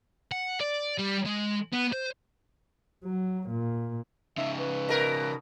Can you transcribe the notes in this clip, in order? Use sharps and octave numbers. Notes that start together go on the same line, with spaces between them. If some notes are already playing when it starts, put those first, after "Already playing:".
F#5
D5
G3
G#3
B3
C5
F#3
A#2
C#3 D#4 E5
B4
B2 A#4